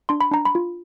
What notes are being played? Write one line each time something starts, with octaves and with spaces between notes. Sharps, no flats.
D4 C6
B5
D4 A#5
B5
F4